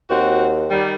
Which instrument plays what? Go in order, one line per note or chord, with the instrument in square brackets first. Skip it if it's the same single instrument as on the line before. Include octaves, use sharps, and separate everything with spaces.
[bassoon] D#2 [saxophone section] C4 F#4
[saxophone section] D#3 G3